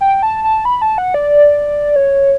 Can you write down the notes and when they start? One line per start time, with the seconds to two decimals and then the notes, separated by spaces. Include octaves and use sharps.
0.01 G5
0.23 A5
0.44 A5
0.65 B5
0.82 A5
0.98 F#5
1.14 D5
1.96 C#5